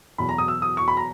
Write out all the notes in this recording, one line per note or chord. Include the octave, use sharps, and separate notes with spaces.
E2 B2 F#3 B5
A#5
D#6
E6
D#6
C#6
B5
A#5